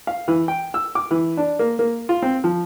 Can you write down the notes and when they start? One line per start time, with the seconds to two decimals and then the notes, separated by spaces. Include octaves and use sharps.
0.07 F5
0.28 E3
0.48 G5
0.74 E6
0.95 D6
1.11 E3
1.37 D4
1.59 A#3
1.79 A#3
2.09 F4
2.22 C4
2.44 F3